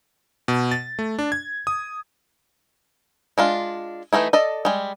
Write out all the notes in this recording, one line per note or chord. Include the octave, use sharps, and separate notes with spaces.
B2
A6
A3
D4
G#6
D#6
G#3 D4 F4
E3 A3 D#4 E4
A4 D5 D#5
G3 G#3